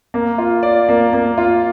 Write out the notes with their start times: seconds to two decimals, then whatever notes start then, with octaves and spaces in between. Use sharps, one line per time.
0.14 A#3
0.38 F4
0.63 D5
0.89 A#3
1.13 A#3
1.38 F4